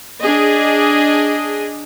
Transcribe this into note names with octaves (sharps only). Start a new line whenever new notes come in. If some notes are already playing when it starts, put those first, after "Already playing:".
D4 G#4 D#5